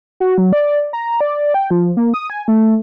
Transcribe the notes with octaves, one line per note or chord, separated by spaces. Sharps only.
F#4
F#3
D5
A#5
D5
G5
F3
A#3
D#6
G#5
A3